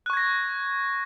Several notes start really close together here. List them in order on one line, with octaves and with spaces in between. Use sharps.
F#6 C#6 G#6 A#6